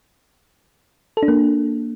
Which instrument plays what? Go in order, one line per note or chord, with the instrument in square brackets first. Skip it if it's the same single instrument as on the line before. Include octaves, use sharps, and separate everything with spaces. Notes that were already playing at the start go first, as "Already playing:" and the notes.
[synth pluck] A4
D4
A#3